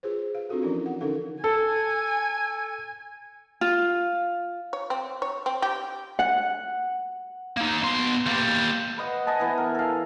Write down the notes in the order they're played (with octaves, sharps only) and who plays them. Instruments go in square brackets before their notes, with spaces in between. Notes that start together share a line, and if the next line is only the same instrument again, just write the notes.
[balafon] F4 G#4 B4 C5
F5
C4 D4 F4 F#4 A4
E3 F3 C#4 E4 A#4
F#5
D3 C#4 D#4 A4 A#4 F5
[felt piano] A4 [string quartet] G#5
[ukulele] F4
[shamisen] C#5
C4
C#5
C4
G4
[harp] F#5
[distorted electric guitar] A#3 D#4
B2 C6
G3 A#3
[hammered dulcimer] B4 C5 D#5 F#5
D#5 G#5 A5 B5
E3 B3
A#4
A4 F5